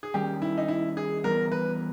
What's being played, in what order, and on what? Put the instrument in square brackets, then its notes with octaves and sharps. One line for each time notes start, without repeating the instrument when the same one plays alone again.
[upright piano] G#4
[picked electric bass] D#3 G3 C#4 [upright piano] G4
[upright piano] E4
D#4
E4
G#4
[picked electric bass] E3 G3 B3 [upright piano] A#4
[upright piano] B4